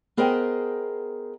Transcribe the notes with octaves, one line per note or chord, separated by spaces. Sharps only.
B3 G#4 A#4 C5 D#5 G5